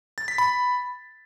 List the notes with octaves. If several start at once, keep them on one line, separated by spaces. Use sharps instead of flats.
A6
B6
B5